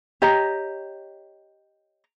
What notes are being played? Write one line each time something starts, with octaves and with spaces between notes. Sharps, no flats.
G4 C#5 D#5 A#5